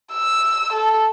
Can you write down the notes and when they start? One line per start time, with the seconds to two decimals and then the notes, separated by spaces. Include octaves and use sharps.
0.13 E6
0.73 A4